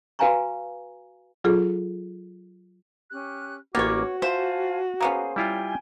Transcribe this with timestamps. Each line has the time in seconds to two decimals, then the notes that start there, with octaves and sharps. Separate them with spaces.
0.19 F#4 B4 F5 G#5 A#5 C#6
1.44 F#3 F4 G#4 A4
3.10 C#4 G4 F#6
3.75 A1 A#3 B3 C#4 F#4 C#5 D6
4.22 F4 C5 E5 G#5 A5
5.01 A#3 B3 C#4 G#4 C5
5.36 G3 E4 F4 G5 G#5